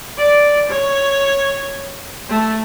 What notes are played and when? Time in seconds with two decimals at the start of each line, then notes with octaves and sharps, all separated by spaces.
0.18 D5
0.70 C#5
2.30 A3